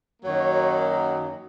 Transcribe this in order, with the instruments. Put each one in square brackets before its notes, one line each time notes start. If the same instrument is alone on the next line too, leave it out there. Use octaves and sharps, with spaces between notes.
[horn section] F#2 D#3 F#3 A#3 C#5